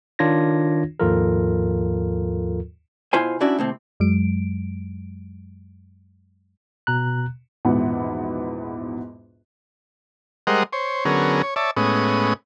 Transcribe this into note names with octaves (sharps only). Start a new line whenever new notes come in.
D#3 D4 F4 C#5 G#6 A#6
D#2 G#2 F3 F4 A4 A#4
B2 E4 F4 C5 G#5
C#4 D4 E4 F#4 D5
D#2 A2 C3 C4
F#2 F#3 G#3 D7
B2 A#5 F#6
A#1 E2 G#2 B2 B3 F#5
G3 G#3 A#4 C5 D#5 F#5
C5 C#5
D3 F#3 B3 C#4 G#4 A#4
C#5
C#5 D5 E5 A5
A2 G#3 B3 C#4 D#6